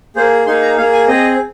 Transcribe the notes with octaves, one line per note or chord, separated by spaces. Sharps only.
A#3 G#4 C5
A#3 D#4 G#4 C6
A#5
A#3 G#4 F5
G#5
C4 G#4 D#5